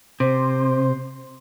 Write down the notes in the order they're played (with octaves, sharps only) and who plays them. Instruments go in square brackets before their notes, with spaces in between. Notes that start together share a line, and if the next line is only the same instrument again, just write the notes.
[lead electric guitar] C3 [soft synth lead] C5